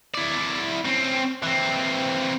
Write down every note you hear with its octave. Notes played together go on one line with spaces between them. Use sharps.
E4 D5
C4 C#4
E3 C4